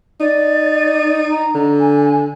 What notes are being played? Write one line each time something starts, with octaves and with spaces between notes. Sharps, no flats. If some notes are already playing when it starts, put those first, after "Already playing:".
D#4 D5
A#5
D3
G#5